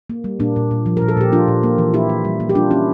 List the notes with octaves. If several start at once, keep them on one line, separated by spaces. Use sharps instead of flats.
A#3
G3
A#2 A#3 D4
A#2
A#2
F3
A#4
A#2
A4
A#2 G4
F3 D4 F4
A#2
A#3
E3
A#3 E4 G4
A#3
G3
A#3
G4
G3 D4 F4
A#3 C#4 E4